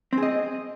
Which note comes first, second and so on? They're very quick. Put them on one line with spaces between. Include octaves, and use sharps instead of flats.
C4 G#4 D#5